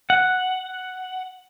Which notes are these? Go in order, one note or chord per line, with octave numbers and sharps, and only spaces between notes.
F#5